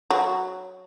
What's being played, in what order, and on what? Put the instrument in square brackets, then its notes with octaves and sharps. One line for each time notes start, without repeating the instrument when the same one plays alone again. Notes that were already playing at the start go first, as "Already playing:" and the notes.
[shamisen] F#3